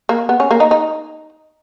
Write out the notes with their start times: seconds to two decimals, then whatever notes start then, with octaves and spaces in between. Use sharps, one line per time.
0.09 A#3
0.29 B3
0.40 C#4
0.51 A#3
0.60 D#4
0.71 D#4